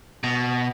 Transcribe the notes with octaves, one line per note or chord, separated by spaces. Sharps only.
B2